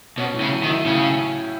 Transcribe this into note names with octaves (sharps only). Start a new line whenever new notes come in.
B2 C#4
A2
C#3
F#3
D#3
E4
A2 C#3